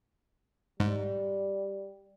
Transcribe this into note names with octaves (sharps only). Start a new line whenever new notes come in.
G#2 G3